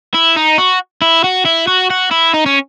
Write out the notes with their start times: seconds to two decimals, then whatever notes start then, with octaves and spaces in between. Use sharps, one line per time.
0.15 E4
0.37 D#4
0.58 F#4
1.02 E4
1.24 F#4
1.45 E4
1.67 F#4
1.90 F#4
2.11 E4
2.34 D#4
2.46 C#4